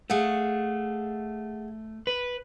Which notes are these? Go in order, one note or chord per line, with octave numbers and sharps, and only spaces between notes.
A3 G#4 F5 F#5
B4